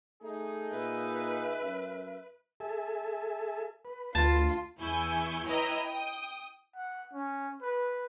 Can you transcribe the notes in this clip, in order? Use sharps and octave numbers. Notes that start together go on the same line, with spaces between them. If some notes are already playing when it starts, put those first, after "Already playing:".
A3 D#4 G#4
A#2 B4 E5
F#2
G#4 A4 E5
B4
D2 F4 A5
E2 E4 G#5 C#6 G6
E4 B4 C#5 D#5 G5 A#5
G5 D#6
F#5
C#4
B4